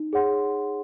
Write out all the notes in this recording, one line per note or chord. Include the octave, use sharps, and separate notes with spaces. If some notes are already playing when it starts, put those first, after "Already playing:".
Already playing: D#4
G#4 C#5 F#5 C6